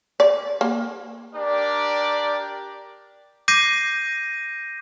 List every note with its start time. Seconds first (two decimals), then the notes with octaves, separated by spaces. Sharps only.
0.20 D5
0.61 A#3
1.34 D4 G4 A#4 D5
3.48 D6 G6 A#6 C7 D#7